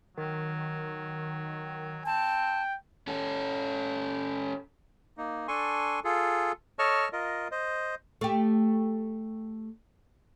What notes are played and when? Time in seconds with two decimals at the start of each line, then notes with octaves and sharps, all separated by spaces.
0.18 D#3 F#3
2.06 C4 G5 A5
3.07 C#4 A4
5.17 A#3 D#4
5.48 D4 A4 G#5 C6 C#6
6.04 F4 G#4 A4
6.79 A4 C#5 D#5 A5 C#6 F6
7.13 F4 A#4 D#5
7.52 C5 D#5
8.21 A3 G4